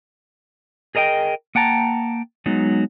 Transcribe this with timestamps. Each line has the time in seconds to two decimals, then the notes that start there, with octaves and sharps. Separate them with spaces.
0.95 G#4 A#4 D#5 F#5 G5
1.55 A#3 F#5 G5 A5 A#5
2.46 F#3 G#3 B3 D#4